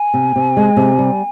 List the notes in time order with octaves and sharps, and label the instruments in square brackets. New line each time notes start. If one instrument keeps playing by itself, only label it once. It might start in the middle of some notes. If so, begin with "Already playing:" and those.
Already playing: [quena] G#5
[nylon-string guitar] C3
C3
G#3
C3
G3